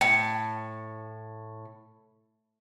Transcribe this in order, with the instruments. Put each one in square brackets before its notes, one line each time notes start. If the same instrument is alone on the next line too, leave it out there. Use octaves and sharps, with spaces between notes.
[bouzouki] A2 [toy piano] G5